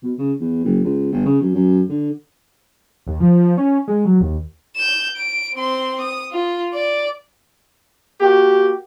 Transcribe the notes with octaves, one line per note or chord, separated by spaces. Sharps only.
B2
C#3
E2
F#1
C#2
G1
C#3
F#2
F#2
D3
D#2
F3
C#4
G#3
F#3
D#2
G6 E7
D7
C4 C6
D#6
F4
D5
A#3 F#4 G4